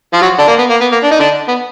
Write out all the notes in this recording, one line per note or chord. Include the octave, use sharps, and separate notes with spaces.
F3 F4
F#3 F#4
D3 D4
A#3
B3
A#3
B3
A#3
D4
D#4
D3 D4
B3